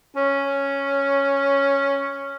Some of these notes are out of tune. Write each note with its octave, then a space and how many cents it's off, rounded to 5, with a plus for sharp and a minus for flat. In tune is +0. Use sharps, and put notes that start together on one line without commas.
C#4 +0